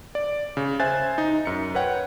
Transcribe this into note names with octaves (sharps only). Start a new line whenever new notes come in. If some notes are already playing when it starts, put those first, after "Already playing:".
D5
C#3
C5 E5 G#5 F#6 A6
D#4 A#5
F#2 C#7
B4 C#5 F#5 G5